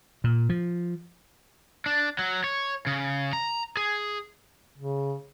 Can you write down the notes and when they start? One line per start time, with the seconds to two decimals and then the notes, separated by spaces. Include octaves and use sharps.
0.24 A#2
0.49 F3
1.86 D4
2.19 F#3
2.44 C#5
2.87 C#3
3.33 A#5
3.77 G#4
4.77 C#3